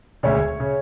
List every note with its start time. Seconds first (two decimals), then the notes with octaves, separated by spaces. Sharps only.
0.23 E1 D2 C#3 C#5 E5
0.60 C#3